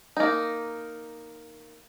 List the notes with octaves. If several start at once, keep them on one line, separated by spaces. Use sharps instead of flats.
A#3 D#4